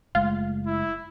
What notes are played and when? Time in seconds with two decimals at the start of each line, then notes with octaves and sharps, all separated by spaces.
0.15 F#1 G#3 A3 F4
0.66 E4